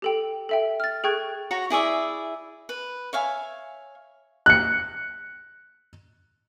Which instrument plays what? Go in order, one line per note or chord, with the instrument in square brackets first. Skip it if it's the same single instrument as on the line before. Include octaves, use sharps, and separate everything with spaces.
[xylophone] G4 A4 G5
A4 E5 G5
F6 A6
G#4 A4 G5 C#6 F#6 G#6
[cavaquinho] F#4 C#5 A#5
E4 G#4 D5 E5
B4
C#5 E5 F5 G#5
[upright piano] F#6 C#7